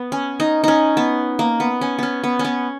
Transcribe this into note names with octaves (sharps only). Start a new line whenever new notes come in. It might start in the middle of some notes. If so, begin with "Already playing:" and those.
Already playing: B3
C#4
D#4
C#4 D#4
B3
A#3
B3
C#4
B3 C#4
B3
C#4
B3